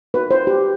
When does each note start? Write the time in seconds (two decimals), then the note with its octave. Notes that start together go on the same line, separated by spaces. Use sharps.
0.14 B3 D#4 F#4 B4
0.31 C5
0.47 G4